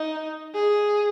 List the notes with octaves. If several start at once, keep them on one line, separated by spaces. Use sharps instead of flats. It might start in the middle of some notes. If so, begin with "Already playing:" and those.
Already playing: D#4
G#4